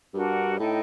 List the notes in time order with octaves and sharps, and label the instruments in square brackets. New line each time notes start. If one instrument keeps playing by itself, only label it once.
[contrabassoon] G2 [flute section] D4 F#4 A#4 F#5
[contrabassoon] A2 [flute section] D#4 A4 D#5 G5